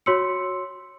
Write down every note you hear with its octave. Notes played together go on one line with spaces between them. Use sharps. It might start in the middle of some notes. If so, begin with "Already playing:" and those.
F#4 C#5 C6 E6 C#7